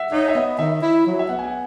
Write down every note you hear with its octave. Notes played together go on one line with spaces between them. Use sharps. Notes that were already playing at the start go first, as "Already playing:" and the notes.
Already playing: E5 F#5
D#4 C#5
E5
B3 D#5
D#3 E5
E4
F#3
E5
B3 F#5
G#5
F#5